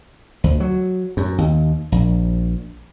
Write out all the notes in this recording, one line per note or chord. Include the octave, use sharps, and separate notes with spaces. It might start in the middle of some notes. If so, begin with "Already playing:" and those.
D2
F#3
F#2
D#2
A#1